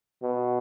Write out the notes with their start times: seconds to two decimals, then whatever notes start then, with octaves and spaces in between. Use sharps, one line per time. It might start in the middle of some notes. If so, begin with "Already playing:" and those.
0.22 B2